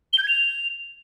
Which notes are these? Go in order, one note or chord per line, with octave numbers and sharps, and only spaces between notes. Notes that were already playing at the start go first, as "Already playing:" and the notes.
G7
G6
G#6
F7